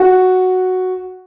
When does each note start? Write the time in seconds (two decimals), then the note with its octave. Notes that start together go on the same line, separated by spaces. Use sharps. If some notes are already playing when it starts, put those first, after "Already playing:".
Already playing: F#4